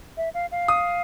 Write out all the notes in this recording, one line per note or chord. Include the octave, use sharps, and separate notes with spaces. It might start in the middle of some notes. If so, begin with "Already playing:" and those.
E5
F5
F5
D#6